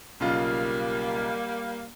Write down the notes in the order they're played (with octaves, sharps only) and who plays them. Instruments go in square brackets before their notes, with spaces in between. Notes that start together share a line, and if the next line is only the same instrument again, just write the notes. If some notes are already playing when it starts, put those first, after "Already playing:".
[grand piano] B1 C#3 F4 [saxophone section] G3 A#3